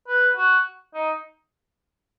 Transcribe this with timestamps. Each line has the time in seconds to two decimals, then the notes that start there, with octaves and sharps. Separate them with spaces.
0.08 B4
0.37 F#4
0.94 D#4